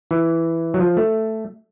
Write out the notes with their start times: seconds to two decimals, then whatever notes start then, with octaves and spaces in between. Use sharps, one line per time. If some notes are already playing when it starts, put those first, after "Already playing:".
0.11 E3
0.74 F#3
0.79 F3
0.97 A3